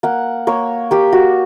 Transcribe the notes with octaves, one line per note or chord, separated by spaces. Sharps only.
A#3 F#5
A#3 C#5
A#3 G4
F#4